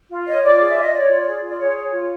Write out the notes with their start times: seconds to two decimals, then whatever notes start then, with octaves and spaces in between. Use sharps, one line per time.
0.09 F4
0.26 C#5 D#5
0.43 F4 D5
0.60 G#4
0.68 E5
0.76 F4 D#5
0.92 C#5 D5
1.09 F4
1.26 G#4
1.43 F4
1.49 D5
1.58 G#4 C#5
1.76 C#5
1.92 F4